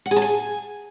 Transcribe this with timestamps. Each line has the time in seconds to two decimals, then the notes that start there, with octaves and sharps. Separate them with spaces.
0.06 F#5
0.11 G#4
0.16 A5
0.22 G#5